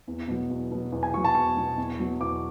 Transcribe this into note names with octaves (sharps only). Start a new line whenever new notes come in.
E2
B2 F#3
E2
B2 F#3
E2
G#5
B2 F#3 C#6
A5
E2 C#6
B2 F#3
E2
B2 F#3
E2 D6